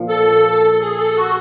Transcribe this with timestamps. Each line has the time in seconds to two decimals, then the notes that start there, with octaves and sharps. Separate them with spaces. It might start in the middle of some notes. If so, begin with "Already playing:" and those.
Already playing: A#2 F3
0.09 A4
0.71 A4
0.81 G#4
0.99 A4
1.17 F#4